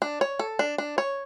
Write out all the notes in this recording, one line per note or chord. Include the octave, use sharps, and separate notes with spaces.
D4
C#5
A4
D4
D4
C#5